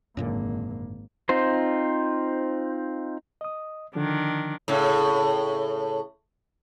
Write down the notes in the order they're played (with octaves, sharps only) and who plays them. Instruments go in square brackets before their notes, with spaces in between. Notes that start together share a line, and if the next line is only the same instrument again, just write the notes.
[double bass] G#1 A#3 [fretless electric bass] F#2 A#2 D3
[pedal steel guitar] C4 D#4 F4 C5
[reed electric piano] D#5 D#6
[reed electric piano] D3 F3 [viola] D#3 D4
[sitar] A2 C#3